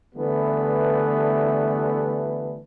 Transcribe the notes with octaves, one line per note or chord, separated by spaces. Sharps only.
D3 E3 G3 A3 B3